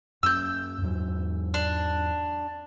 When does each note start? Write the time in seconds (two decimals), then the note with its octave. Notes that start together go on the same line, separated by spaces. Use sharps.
0.23 F#2 A#3 C#4 E6 G6
0.82 E2 G#2 F#3
1.54 D4